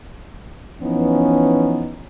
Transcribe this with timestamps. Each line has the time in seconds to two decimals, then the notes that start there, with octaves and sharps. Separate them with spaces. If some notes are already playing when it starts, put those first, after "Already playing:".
0.82 E3 F3 B3 C#4 D#4